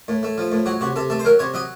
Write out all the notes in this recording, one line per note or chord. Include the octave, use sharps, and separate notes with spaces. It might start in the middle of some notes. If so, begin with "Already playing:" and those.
A2
A3
F3
A2
F#3 F#4
C3 F#4
C3 A4
A3 A4
C5
F#3 A#4
C3 C#5
F#3 D#5